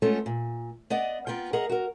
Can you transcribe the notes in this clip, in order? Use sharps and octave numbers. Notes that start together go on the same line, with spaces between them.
G#3 A3 B3 C#4 F4 A4
A#2
B3 D5 D#5 F#5
A#3 B3 F4 G5
G#4 A#4 D#5 F#5
F#4 A#4